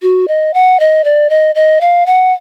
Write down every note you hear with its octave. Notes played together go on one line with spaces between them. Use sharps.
F#4
D#5
F#5
D#5
D5
D#5
D#5
F5
F#5